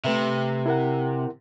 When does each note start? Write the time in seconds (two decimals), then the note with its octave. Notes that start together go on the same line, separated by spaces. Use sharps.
0.04 C3 A3 B4 E5
0.66 E4 A#4 F#5